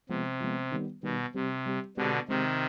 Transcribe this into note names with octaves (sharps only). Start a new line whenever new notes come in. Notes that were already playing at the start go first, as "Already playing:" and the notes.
C3 F3 G#3 B3
F3 G#3 B3
D#3 G3 B3
B2 D#3 G3 B3
C3 G3 C4 G4
G3 C4 G4
B2 D3 G#3 C4 G4
C3 D#3 G#3 C4 G4